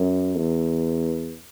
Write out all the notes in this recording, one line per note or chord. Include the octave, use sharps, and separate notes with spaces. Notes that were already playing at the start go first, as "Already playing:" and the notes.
Already playing: F#2
E2